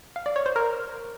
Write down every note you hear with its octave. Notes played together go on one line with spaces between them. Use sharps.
F5
D5
C#5
C5
A#4